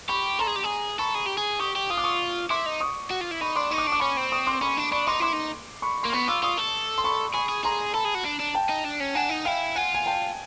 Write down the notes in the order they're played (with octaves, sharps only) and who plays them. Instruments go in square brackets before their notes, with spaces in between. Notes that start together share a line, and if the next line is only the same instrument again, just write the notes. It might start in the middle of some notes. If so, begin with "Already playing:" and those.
[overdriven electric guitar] G4 [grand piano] B5 C#6
[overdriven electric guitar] A4 [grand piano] A#5 C6
[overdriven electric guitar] G#4
G4
G#4
[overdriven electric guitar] A4 [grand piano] B5 C#6
[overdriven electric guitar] G#4
G4
G#4
[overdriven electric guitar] G4 [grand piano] C#6 D#6
[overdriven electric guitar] G4
[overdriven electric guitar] F4 [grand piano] D#6
[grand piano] D6
C#6 D#6
[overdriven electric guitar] E4 [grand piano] C6 D6
[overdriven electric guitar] D#4
[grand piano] C#6 D#6
[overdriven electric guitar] F#4
F4
E4
[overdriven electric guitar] D#4 [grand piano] B5 C#6
[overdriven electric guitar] D4 [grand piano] C6 D6
[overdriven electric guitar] D#4 [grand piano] C#6
[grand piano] D6
[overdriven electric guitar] D4 [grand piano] C#6
[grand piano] D6
[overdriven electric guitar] C#4 [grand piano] B5 C#6
[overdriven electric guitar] C4
[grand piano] C#6 D#6
C6 D6
[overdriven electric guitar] C#4 [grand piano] B5 C#6
[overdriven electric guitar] D4
[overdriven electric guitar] D4 [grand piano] B5 C#6
[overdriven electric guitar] D#4 [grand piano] C6 D6
[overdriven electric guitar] E4 [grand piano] C6 D6
[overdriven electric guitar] D#4
[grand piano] B5 C#6
[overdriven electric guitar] A#3 [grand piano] C6
[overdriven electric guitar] B3 [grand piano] B5 C#6
[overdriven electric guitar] F4 [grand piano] D6 E6
[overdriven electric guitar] F4 [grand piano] C#6 D#6
[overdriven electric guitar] A4
[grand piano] C6
B5 C#6
[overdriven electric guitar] G#4 [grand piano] B5 C#6
[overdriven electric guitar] G#4
[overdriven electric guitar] G#4 [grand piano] A#5 C6
[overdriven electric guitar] A4 [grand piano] A5 B5
[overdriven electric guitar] G#4
F#4
D4
D4
[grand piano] G5 A5
[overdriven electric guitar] D#4
D4
C#4
[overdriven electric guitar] D4 [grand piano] F#5 G#5
[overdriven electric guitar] D#4
[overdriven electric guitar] E4 [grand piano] F5 G5
[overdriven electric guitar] F4 [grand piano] F#5 G#5
[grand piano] G#5
G5 A5